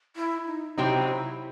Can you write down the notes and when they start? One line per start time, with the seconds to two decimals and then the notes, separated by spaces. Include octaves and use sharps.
0.16 E4
0.47 D#4
0.78 C3 F#3 C4 D#4 E4 G4
1.02 F#4
1.08 E4